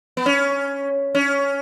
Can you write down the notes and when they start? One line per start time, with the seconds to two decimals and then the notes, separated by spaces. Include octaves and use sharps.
0.17 B3
0.26 C#4
1.15 C#4